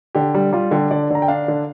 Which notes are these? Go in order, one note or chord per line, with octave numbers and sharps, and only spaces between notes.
D3 G4
G3 G4
G3 F4
D3 G4
D3 D5
D3 A#5
G5
D4 F5
D3